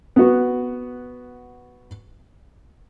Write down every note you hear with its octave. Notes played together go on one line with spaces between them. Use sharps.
B3 F#4